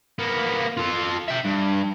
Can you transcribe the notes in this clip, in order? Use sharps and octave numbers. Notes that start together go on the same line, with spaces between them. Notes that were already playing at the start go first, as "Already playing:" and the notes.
A#3 B3
F4 A4
E5 G5
G2